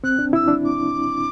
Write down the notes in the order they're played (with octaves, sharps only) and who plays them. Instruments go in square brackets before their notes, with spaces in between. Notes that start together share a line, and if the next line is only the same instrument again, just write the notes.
[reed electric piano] C4 [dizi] F#6
[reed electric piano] D4
[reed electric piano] E4 [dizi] E6
[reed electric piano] D4
[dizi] D6